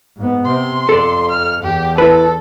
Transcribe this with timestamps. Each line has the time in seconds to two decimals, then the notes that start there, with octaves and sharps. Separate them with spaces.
0.17 G#2 B3
0.46 C3 C6
0.89 F2 A4 D5
1.32 F6
1.63 E2 G4
1.98 E4 A4 B4